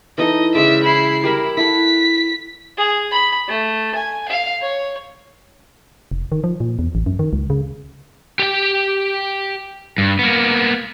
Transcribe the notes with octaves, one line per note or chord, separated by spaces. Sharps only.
E3 D#4 A4 D#5
C#3 G#3 D5 E5
E4 C7
G3 E4 A#4 E5
E4 A4 F#5 B6
G#4
B5
A3
G#5
F5
C#5
F1
D#3
F3
A#2
E2
A1
F#2
D#3
C#2
C#3
G4 G5
G2
A#3 B3